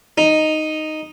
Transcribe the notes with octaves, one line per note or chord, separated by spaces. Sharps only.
D#4